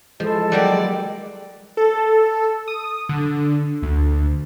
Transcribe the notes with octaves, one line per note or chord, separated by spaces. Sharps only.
F3 G#3 E4 A4 A5
F#3 G3 A#3 D5
A4
D#6
D3
D2